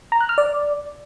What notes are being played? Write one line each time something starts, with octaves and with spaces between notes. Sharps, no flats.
A#5
F#6
F6
D5